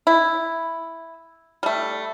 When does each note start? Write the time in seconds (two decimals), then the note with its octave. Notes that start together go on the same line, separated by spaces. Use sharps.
0.07 E4
1.63 G3 A3